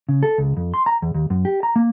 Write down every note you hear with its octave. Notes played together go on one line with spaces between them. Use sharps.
C#3
A4
C#2
F2
C6
A#5
E2
D#2
F#2
G4
A#5
A#3